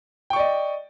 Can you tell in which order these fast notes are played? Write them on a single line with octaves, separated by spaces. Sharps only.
G5 C#6 D5 D#5